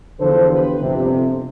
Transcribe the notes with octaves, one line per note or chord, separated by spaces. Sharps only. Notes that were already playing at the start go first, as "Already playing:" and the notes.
E2 D3 F3 A4 C5
G4 B4
G1 F2 C3